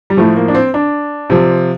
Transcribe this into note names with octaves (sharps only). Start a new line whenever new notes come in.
G3
A2 F3 A3
A#3
D4
C4
D4
C3 F3